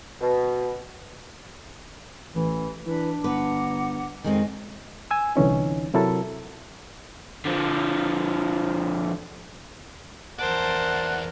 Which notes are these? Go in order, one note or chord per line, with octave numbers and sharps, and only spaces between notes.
B2
A1 E3
E3 D4 B4
G1 B4 F#5 A#5 D6
F2 D#3 G#3 C4 D#5 G#5
G#5 E6
C2 D3 E3 C#4 D#4
C3 F#3 E4 F#4 A4 A#4
D3 F3
E2 A#4 C5 D5 F#5 A5